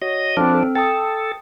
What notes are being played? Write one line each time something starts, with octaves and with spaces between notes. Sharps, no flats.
F#4 C#5 D#5
F3 C4 D4 A4 F6
A4
A4 G5 A5 D#6